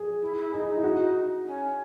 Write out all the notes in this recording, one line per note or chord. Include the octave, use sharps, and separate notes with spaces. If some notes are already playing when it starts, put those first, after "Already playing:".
Already playing: G#4
E4
E4
D#4 G#4
D#4
E4
F#4
C#4